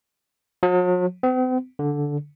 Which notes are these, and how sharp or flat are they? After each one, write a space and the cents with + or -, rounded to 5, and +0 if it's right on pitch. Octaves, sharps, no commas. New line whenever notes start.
F#3 -45
C4 -45
D3 -10